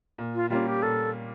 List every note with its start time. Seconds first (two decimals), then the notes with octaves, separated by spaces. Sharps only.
0.18 A#2
0.35 F4
0.50 G3 A#3 C#4 F4
0.67 G4
0.83 A#2 A4